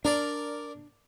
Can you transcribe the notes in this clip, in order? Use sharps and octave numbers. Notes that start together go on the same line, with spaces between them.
D4 A#4 D5